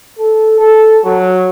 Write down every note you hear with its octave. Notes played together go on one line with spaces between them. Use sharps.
A4
A4
F#3